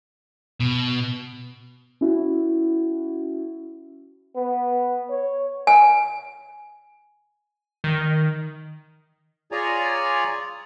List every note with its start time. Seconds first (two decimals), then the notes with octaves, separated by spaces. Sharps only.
0.60 B2
2.01 C#4 E4 F#4
4.35 B3
5.10 C#5
5.67 G#5
7.84 D#3
9.52 F4 G#4 C#5 D5 G#5 A#5